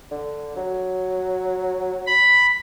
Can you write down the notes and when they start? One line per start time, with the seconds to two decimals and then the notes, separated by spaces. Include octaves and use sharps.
0.11 D3
0.57 F#3
2.07 B5